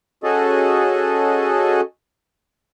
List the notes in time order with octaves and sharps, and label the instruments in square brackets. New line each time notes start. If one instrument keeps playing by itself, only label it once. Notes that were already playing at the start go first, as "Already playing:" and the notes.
[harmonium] C#4 F#4 G#4 A4 D#5 A5